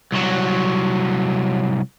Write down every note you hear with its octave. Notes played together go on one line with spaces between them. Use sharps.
C2 F#3